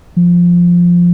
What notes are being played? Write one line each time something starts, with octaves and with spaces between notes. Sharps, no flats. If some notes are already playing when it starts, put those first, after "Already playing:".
F3